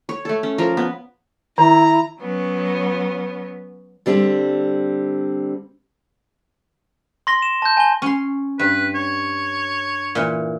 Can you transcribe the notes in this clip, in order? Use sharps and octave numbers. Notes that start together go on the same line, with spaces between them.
C#5
A3 A4
C#4
F3 A#4
B3
D#3 E4 A#5
F#3 B3 C#4
D3 G3 C4
C6 A#6 G7
E7
A5 G6
G#5 G7
C#4 C6
G2 B4
C#5
A#2 E3